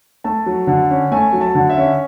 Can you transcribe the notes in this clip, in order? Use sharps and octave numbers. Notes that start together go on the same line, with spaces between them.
A3 A5
F#3
D3
C#4
A3 G#5
F#3
A5
D3
E5
C#4